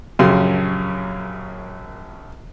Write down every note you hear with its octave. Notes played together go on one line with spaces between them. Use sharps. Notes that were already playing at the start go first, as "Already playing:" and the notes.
A#1 F#2 C#3 G4 C6